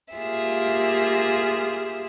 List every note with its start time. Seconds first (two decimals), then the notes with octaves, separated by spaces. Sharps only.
0.14 A#3 F4 G4 G#4 E5